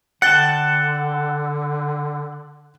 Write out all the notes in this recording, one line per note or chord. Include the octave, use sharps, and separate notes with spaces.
D3 F#5 G5 A5 F#6 A6